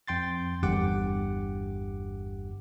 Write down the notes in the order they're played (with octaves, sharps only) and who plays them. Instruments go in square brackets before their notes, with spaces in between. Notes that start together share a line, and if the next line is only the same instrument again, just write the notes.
[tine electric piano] F2 G5 C6 A6
G1 E2 G2 G4 F#5 D6